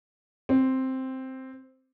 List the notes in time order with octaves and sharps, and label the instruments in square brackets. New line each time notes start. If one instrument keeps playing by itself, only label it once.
[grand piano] C4